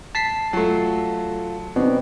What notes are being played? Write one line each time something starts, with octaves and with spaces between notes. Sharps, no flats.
A5 B6 C7
F#3 A3 F4 A4
B2 C4 C#4 D#4 D5